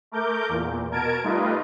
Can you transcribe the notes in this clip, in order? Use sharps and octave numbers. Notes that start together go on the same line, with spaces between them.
A3 A#4 D6 G6
E2 A#2
B2 A#4 A5 G#6 D7
G3 A3 D#4 F4 B4 D#5